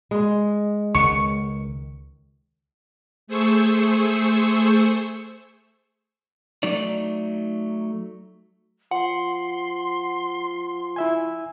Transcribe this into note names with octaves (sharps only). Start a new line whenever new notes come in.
G#3
C#2 D#3 C#6
A3 G#4 C5 C#6 E6
F#3 A3 D#4 D5
F3 F#5 C6
E4 E5 G#5